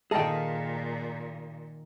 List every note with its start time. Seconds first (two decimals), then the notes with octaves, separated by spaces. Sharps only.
0.11 A#2 D#3 G#4 A4 D#5 F5 G5 A5